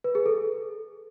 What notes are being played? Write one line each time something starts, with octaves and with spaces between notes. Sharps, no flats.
B4
G#4
A4